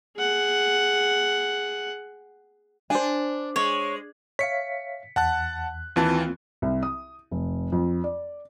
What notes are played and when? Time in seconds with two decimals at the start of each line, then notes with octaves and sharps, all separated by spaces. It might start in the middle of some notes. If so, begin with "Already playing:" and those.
0.17 G#4 F#5
2.90 D4 C5 G#5
3.56 G#3 C#5
4.39 C#5 E5 F5 B6 C#7
5.16 E2 F#5 A5 F#6
5.96 D#2 E3 A#3 C4 F4 A5
6.62 C2
6.83 D#6
7.31 F1
7.72 F2
8.04 D5